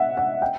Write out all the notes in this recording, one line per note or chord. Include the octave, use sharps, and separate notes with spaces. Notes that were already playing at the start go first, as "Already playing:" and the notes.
Already playing: E5 F#5
F#5
G5